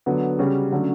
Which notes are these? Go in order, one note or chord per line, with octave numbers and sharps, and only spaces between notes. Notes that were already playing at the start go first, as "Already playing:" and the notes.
D3 F#3 B3
C#3 G3 C#4 F#4
D3 F#3 A3 C#4